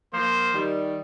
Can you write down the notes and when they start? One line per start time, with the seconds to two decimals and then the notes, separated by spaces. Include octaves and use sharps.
0.13 F3 A#3 C5
0.54 D#3 G3